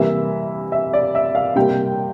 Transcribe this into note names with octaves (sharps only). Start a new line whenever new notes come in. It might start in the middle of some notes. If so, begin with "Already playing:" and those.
Already playing: C3 E3 G3 A#3 E5
E5
D5
E5
F5
C3 G3 A#3 G5